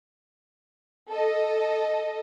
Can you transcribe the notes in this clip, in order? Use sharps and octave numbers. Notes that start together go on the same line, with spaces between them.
A4 D#5